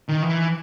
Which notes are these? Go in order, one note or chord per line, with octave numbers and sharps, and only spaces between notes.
D#3
E3